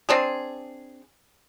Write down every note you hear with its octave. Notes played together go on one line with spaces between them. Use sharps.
C4 D4 G#4